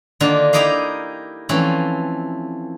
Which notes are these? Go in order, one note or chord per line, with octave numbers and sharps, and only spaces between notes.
D3 D#3 A#3 F4
D#4 E4 G4 A#4 D#5 F5
E3 F3 A3 C4 C#4